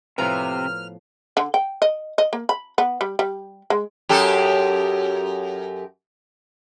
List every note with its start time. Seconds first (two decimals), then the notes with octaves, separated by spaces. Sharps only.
0.18 A2 C3 F3 B3 B4 A#5 F6
1.37 D3
1.54 G5
1.82 D#5
2.18 D#5
2.33 A#3
2.49 B5
2.78 B3
3.01 G3
3.19 G3
3.70 G#3
4.09 F#2 G4 A4